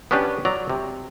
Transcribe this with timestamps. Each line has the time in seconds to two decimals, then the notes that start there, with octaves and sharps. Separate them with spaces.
0.11 B3 C#4 D4 G4 B4
0.45 F#3 D5 A#5
0.70 C3